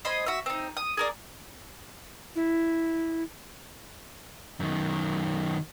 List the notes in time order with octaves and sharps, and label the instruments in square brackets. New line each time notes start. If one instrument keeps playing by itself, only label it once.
[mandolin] C5 D#5 G#5 B5
F#4 E5
C4 D#4
D#6
G#4 A#4 D5
[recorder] E4
[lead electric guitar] F#2 D#3